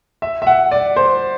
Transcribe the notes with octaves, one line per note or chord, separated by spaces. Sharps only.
E5
E5
F#5
D5
C5